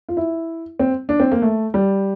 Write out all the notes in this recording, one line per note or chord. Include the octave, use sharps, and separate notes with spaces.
F4
E4
C4
D4
C4
A#3
A3
G3